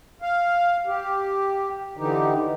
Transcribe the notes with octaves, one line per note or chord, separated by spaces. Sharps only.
F5
G4
D3 E3 D#4 G4